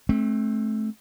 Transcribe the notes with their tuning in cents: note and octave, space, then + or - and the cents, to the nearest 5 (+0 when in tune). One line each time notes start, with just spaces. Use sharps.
A3 -25 C4 +25